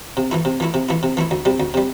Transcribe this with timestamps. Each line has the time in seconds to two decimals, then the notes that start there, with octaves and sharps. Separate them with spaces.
0.17 C3
0.31 E3 A3 E4
0.45 C3
0.60 E3 A3 E4
0.74 C3
0.89 E3 A3 E4
1.03 C3
1.17 E3 A3 E4
1.31 D2
1.45 C3 G3
1.60 D2
1.74 C3 G3